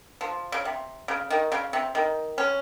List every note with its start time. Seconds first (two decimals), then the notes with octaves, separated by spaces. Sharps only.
0.21 F3
0.52 C#3
0.65 C3
1.08 C#3
1.30 D#3
1.52 C#3
1.73 C3
1.95 D#3
2.38 C#4